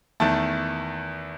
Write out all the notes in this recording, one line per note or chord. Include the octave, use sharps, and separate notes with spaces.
E2 D#3 A3 A5